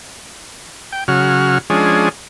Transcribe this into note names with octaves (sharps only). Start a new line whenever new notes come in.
G5
C#3 F#3 F#4 F6
F3 G#3 C#4 D4 G#4